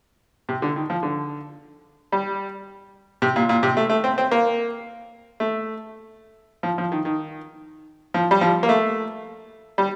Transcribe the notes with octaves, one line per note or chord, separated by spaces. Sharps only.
C3
D3
D#3
F3
D3
G3
C3
A#2
A#2
C3
A3
A3
C4
C4
A#3
A3
F3
F3
D#3
D#3
F3
G3
F3
A#3
A3
G3